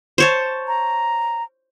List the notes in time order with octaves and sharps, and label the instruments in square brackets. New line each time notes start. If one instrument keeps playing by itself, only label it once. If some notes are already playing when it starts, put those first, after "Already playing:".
[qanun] C5 C#5 A5
[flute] A#5